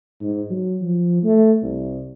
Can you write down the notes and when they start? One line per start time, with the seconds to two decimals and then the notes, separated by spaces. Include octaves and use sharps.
0.22 G#2
0.50 F#3
0.82 F3
1.24 A3
1.63 C2